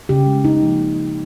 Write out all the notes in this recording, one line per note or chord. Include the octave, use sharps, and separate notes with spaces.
C#3 G4
G#3
C#3 D#4
F3 A#3